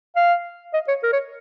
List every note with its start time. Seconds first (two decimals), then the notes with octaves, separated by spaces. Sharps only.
0.16 F5
0.74 D#5
0.88 C#5
1.03 A#4
1.13 C#5